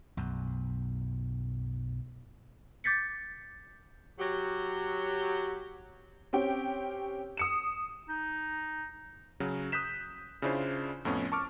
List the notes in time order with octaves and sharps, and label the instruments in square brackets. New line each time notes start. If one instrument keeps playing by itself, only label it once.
[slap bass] B1 F#2
[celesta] D6 G6 A6 B6 C#7
[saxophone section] F#3 G4
[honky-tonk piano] C4 C#4 G4 G5
D#6 C#7 E7
[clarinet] D#4
[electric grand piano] C#3 F#3
D#6 F#6 G6 B6 E7
C#3 C#4 D4 E4 F4 C5
F2 A2 B3 C#4
A5 C#6 D6 F6